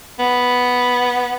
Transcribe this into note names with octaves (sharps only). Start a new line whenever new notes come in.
B3